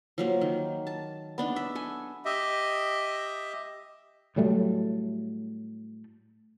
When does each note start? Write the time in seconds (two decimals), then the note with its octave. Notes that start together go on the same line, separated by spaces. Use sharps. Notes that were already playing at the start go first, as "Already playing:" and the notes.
0.18 F3 F#3 A#3
0.41 D#3
0.87 A5
1.38 B3 D4 D#4
1.56 E5
1.75 A4 G#5
2.25 G4 D#5 E5
4.36 A2 F#3 G3 A3